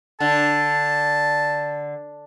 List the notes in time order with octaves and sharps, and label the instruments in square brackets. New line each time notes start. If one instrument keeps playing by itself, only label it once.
[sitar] D3 [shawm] A5